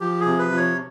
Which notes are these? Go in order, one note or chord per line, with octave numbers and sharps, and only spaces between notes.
F3 G4
G#4
C3
B4
F3
C#5